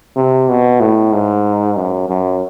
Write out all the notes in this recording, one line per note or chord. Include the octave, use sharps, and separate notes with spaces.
C3
B2
A2
G#2
F#2
F#2